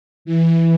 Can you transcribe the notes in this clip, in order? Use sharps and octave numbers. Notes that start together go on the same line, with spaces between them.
E3